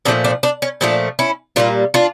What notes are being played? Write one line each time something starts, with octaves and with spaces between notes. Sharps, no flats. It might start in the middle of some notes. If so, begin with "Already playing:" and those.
A#2 F3 A3 D4
D4
D4
C#4
A#2 F3 A3 D4
C#4 E4
A#2 G3 A#3 D4 F4
D4 F4